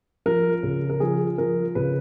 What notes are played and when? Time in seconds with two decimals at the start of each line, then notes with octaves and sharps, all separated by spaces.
0.26 F3 A#4
0.63 C#3
0.90 A#4
1.00 F3 G#4
1.38 F3 A#4
1.75 C#3 B4